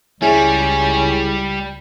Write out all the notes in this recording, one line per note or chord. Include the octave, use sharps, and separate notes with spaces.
C#2 G3 C#4 E4 G#4